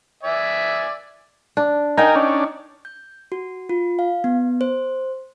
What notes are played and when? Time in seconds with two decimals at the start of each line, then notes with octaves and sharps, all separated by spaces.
0.23 D5 E5 G#5
1.57 D4
1.98 D#4 A#4 G5 G#5
2.16 C#4 D4
2.85 G6
3.32 F#4
3.69 F4
3.99 F5
4.24 B3
4.61 C5